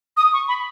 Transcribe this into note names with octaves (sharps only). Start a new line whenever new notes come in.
D#6
C#6
B5